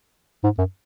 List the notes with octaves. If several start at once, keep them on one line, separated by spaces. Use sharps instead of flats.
G#2
F#2